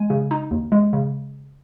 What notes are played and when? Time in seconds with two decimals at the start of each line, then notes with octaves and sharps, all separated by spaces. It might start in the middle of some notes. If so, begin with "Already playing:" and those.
Already playing: G#3 G#5
0.10 C#3
0.31 D#4
0.51 D#2
0.72 G#3
0.93 C#3